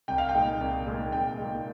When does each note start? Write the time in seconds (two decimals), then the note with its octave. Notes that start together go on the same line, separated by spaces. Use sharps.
0.08 C2 G5
0.18 F5
0.29 G5
0.34 A#2 G#3 D#4
0.60 C2
0.86 A#2 G#3 D#4
1.12 C2 G5
1.38 A#2 G#3 D#4